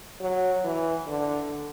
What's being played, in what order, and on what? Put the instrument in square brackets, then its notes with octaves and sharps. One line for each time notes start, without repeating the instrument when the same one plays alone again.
[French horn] F#3
E3
D3